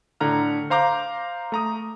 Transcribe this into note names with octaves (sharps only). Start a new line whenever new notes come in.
A2 D3 A#5 F6
C5 F5 A#5 D6 G6
A3 A#5 D#6